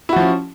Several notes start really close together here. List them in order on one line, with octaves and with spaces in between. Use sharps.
E4 F#4 F3 C#4